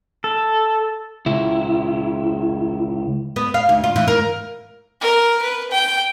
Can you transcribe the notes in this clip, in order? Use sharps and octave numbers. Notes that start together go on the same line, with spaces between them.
A4
C#2 E4
B3
F5
D2
F4
E3
A#4
A#4
B4
G5